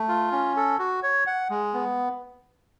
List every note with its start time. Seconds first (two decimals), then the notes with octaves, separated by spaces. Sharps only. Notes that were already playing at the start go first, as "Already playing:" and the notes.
Already playing: A3
0.08 F4
0.32 C#4
0.56 A4
0.79 F#4
1.03 C#5
1.27 F#5
1.50 G#3
1.74 B3